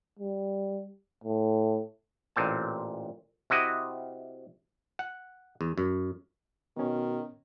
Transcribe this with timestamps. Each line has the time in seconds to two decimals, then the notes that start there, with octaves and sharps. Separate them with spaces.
0.19 G3
1.24 A2
2.36 A1 A#2 C4 A5
3.50 C3 E4 F#4 D#5
4.99 F#5
5.61 E2
5.78 F#2
6.77 B2 D#3 B3 C#4